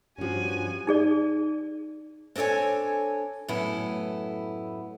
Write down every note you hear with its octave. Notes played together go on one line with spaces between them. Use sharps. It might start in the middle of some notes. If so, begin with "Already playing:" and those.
G2 F3 C#4 F#4 G4 G#5
D#4 G#4 D5
C4 D4 A4 C#5 G#5
F#2 A2 A3 B3 E4